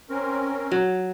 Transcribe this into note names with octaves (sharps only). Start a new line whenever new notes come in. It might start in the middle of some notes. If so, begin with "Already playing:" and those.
C4 C#4 A#4
F#3